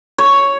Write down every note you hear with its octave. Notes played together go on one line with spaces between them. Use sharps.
C#5